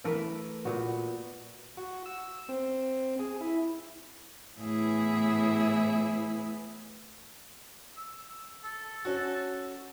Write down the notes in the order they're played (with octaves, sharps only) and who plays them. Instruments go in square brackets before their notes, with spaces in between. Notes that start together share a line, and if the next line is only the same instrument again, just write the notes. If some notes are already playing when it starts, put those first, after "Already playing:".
[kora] E3 A3 A#4 B4
A#2 B3 F#4
[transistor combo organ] F#4
E6
C4
G#4
E4
[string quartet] A2 E3 B3 E4 G#4 E5
[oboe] E6
A4
[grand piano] C#4 F#4